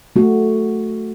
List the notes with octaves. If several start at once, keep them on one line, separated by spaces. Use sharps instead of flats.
A3 F#4